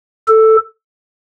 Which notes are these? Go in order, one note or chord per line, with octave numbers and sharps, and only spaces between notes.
A4